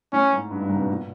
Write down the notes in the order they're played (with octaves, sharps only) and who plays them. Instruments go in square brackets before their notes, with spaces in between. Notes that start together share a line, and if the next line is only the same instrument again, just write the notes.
[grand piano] A2 [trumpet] C#4
[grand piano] G#2
G2
G2
G#2
C3
B2
A#2